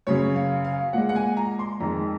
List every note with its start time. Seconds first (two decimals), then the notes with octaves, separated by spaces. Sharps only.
0.07 F#2 C#3 F#3 C#5
0.36 F5
0.65 F5
0.93 A#2 G#3 F#5
1.09 F#5
1.16 G#5
1.37 A#5
1.59 C6
1.80 F2 D#3 G#3 A#5